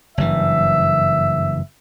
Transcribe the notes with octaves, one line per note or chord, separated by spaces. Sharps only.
F#1 G2 E3 E5